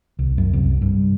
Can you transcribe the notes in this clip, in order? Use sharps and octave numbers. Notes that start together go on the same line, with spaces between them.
C2
F#2
C2
G2